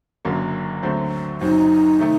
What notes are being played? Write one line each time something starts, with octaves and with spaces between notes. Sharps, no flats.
F#1 F#2 D3 F#3 A#3
D2 D3 F#3 A3 C4
F#1 F#2 F#3 C4 D#4
C3 D#3 A3